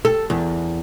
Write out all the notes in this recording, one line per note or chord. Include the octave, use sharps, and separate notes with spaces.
A4
E2